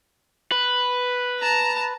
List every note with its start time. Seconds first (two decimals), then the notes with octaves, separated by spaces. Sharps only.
0.52 B4
1.39 A5 A#5